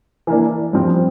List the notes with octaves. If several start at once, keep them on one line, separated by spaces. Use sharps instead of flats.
E3 A#3 D4
G2 F3 C4 F4